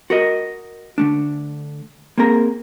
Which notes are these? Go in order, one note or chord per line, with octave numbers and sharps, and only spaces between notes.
F#4 A#4 D#5
D3 A3 D4
A#3 C4 G#4 A#4 A#5